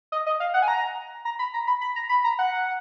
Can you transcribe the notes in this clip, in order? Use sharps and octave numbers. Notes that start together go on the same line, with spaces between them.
D#5
D#5
F5
F#5
G#5
A#5
A#5
B5
A#5
B5
B5
A#5
B5
A#5
F#5